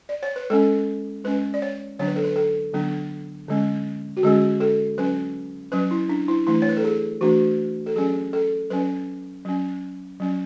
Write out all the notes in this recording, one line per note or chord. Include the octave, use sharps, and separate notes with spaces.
D5
C#5
B4
G#3 C#4 A4
G#3 C#4 B4
D5
C#5
D3 F#3 B3 D4 C#5
B4
A4
B4
A4
D3 F#3 B3 D4
D3 G#3 C#4
F#4
D3 G#3 C#4 G#4
A4
F#3 C#4 B4
F#3 C#4 B4
E4
D4
E4
E3 A3 D4 E4
C#5
B4
A4
G#4
E3 A3 D4 F#4
A4
F#3 C#4 G#4
A4
F#3 C#4 B4
F#3 C#4
F#3 C#4